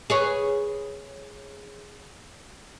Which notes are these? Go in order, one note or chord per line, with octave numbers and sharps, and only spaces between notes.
G#4 B4 C#5